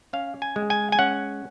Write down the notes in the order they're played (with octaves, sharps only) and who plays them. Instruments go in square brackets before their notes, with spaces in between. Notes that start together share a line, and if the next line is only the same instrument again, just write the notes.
[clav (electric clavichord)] C#4 F5
G#5
G#3
G#5
G#5
C#4 F#5